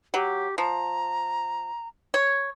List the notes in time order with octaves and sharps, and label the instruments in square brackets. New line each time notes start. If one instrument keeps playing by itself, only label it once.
[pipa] F#3 [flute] G4
[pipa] F3 [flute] A#5
[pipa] C#5